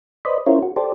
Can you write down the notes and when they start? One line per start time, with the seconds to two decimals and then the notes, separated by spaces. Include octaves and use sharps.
0.25 B4 C5 D5 D#5 B5
0.46 C#4 E4 F4 A#4 C5 C#5
0.63 F#4
0.76 G4 A4 C5 D5